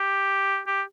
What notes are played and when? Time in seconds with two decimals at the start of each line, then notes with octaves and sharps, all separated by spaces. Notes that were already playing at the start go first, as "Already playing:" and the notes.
Already playing: G4
0.67 G4